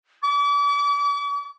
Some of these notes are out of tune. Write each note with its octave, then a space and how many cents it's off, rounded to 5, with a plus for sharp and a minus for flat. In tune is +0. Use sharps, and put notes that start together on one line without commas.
D6 -40